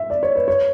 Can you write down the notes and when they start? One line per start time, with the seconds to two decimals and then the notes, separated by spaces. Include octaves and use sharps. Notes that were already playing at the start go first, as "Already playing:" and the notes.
Already playing: E5
0.10 D5
0.23 C#5
0.35 B4
0.48 C#5